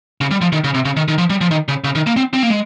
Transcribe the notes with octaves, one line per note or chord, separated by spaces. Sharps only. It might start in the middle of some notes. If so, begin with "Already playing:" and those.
C#3
G3
F3
D#3
C#3
C3
C#3
D#3
D#3
F3
G3
F3
D#3
C#3
C#3
D#3
A#3
C4
C4
A#3
G#3